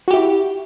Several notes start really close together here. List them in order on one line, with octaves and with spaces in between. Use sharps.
F#4 G4 E4